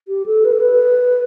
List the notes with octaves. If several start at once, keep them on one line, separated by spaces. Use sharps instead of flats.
G4
A4
B4
A4
B4